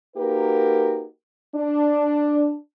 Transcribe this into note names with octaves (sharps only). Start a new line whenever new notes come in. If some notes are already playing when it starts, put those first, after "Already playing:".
A#3 D#4 F#4 G4 A#4 B4
D4